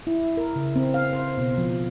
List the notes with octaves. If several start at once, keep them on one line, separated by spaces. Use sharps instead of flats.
E4
A#4
C#3
C4
F5
C5
B2
F3